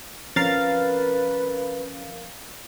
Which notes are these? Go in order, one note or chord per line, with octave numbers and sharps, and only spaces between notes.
F3 C4 C#4 A#4 B4 F5 A6